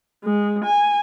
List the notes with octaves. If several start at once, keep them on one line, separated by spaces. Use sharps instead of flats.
G#3
G#5